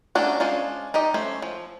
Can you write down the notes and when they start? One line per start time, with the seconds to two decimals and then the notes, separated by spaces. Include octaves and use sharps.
0.15 A3 A#3 C#4 D4 F#4
0.40 G#3 C#4 D4 F4 C5
0.94 D#4 G4 D#5
1.14 A3 C#4 C5
1.42 F3